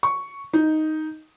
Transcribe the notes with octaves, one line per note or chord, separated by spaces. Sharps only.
C#6
D#4